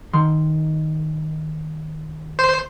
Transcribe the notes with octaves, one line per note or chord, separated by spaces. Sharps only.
D#3 C6
C5